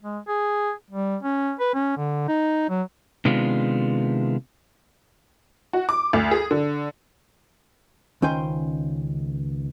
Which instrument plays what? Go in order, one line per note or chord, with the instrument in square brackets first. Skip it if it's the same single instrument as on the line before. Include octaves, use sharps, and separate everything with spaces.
[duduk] G#3
G#4
G3
C#4
B4
C#4
D3
D#4
F#3
[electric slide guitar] C3 D#3 G#3 B3 D4 F4
[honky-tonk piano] F#4
D6
D2
G#4
D3
[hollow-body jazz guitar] C#2 D#3 C#4 C5 G5 G#5